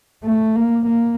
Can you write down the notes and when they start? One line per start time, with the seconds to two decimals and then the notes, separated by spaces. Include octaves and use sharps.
0.24 A3
0.56 A#3
0.86 A#3